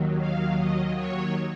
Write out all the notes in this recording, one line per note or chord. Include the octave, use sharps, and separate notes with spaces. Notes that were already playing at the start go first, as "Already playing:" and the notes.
Already playing: D#2 D#3 F#3
F5
D#5
C#5